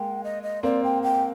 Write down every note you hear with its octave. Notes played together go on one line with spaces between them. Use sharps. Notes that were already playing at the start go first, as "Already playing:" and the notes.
Already playing: G#3 A#3 G5
D#5
D#5
A#3 C4 D5
G5
G5